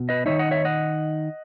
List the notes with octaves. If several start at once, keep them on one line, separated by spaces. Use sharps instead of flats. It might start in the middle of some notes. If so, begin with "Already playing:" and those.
Already playing: B2
B4 D#5
D#3 G#3 D#4 C#5 E5
D#5 F#5
C#5 E5
D#5 F#5